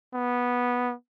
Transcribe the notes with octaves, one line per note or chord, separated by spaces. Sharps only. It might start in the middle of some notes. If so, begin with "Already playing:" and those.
B3